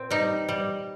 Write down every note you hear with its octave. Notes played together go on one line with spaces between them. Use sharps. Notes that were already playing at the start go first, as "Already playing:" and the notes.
Already playing: A#2 C4
G3 D#4
G3